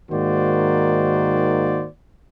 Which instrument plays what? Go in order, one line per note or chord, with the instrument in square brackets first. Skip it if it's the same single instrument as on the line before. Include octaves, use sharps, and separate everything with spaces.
[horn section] G#2 D#3 A#3 F#4 C5 D5